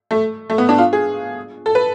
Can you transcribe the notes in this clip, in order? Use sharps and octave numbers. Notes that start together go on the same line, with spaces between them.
A3
A3
B3
D4
F4
G#4
A4
B4